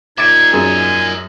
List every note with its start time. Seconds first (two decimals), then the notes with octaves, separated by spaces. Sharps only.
0.18 A#2 D#4 A#4 E5 D6 G#6 A6 D7
0.52 F#2 G#4 G#5